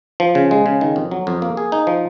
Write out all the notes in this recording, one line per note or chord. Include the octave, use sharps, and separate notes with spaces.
F3
C#3
G#3
C#3
D#3
F2
F#3
F2
A#3
G#4
D#4
F3